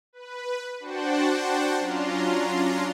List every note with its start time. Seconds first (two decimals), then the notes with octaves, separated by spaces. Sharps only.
0.13 B4
0.80 D4 F#4 C5 F#5 G5 A5
1.78 F#3 C#4 D4 F4 A#5 C6